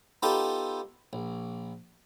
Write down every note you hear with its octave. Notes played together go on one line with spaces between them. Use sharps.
B3 D#4 F4 G4 A4 B5
A#1